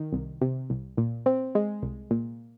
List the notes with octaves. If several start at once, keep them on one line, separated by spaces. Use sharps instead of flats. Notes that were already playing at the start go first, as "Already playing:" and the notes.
Already playing: D#3
C2
C3
C2
A#2
C4
G#3
C2
A#2